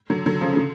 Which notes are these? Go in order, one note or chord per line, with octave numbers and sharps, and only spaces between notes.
D3 F#3
D3 F#3
C#3 F3
C#3
D3